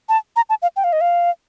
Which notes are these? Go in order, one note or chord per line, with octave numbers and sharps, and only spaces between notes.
A5
A#5
A5
F5
G5
F5
D#5
F5